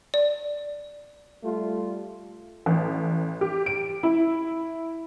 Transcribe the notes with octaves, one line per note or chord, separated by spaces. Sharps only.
D5
G3 A3 F4
A1
G4
D7
E4